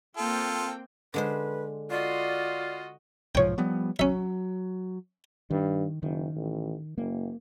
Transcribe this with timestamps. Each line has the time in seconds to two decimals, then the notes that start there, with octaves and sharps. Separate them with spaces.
0.17 A#3 C4 F4 A4 G5
1.14 D3 G#3 B4 C5
1.90 F4 F#4 D5 D#5
3.35 B1 G#2 F3 C#5 G5
3.58 F3 G3 B3
3.99 F#3 C#4 E5
5.50 G2 D#3
6.03 F#1 D#3
6.36 A1
6.98 F#1 A#3